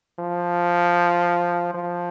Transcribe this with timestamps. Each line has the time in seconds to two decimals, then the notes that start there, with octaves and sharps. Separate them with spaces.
0.19 F3
1.74 F3